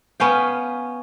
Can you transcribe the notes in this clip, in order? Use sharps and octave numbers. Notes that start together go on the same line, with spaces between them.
B3 C#4 F5 G5